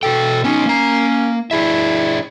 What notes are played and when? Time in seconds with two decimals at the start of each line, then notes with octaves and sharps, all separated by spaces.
0.03 B2 F#4 A4 G5
0.44 B3 C#4 D#4
0.66 A#3 A#5
1.51 D4 E4 G#4 E5